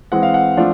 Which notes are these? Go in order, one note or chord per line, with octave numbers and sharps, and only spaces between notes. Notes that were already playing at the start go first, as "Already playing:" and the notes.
E3 G#3 C4 F#5
F5
F#5
F3 A3 D4 F4